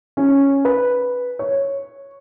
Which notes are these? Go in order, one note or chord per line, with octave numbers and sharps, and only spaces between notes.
C#4
B4
C#5